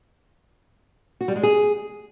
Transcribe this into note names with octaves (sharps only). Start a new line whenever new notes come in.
F#4
G3
G#3
G#4